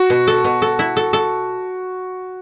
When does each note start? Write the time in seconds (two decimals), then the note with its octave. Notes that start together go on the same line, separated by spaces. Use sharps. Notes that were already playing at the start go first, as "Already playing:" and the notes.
Already playing: F#4
0.10 B2
0.27 A4
0.44 B2
0.62 A4
0.79 E4
0.96 A4
1.13 A4